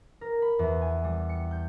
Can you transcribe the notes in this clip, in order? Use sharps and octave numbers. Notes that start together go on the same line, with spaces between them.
A#4
B5
E2
G#5
G3
C#7
G6